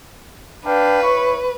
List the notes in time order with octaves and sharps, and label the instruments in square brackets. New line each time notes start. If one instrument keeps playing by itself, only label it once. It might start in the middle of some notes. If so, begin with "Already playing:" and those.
[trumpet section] D4 F5 G5 [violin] B4
[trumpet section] E4 C#5 C#6